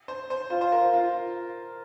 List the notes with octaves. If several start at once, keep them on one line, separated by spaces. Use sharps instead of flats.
C5
C5
F4 C5
C5
A#4
F4